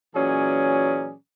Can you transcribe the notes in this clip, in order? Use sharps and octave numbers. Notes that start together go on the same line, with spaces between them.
A#2 E3 F#3 C#4 G#4 D5